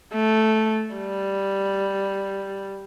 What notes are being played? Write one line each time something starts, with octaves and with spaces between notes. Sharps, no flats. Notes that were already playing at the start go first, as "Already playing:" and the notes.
A3
G3